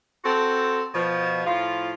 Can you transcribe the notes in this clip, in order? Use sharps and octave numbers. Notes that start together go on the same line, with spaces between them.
C4 F#4 A4
B2 F3
A2 F3 F4